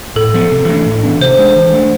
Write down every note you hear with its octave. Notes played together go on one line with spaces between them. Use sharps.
A2 A4
F3 B3
C3
E3 A3 D4
A2
E3 B3 D4
C3 C5
G#3 D4
E3
A3 D4